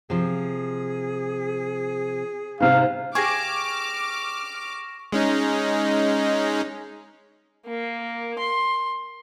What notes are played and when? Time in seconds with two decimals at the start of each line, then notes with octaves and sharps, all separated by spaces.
0.10 C3 F3 G#4
2.60 G#2 C3 G4 F5
3.15 G4 G#4 G#5 C#6 D6 F6 A#6
5.12 G#3 C#4 D#4
7.66 A#3
8.38 C6